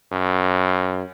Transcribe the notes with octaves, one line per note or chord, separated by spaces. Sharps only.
F#2